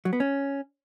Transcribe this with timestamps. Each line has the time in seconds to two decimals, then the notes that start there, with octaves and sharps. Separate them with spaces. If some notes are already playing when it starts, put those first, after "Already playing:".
0.05 F#3
0.13 B3
0.20 C#4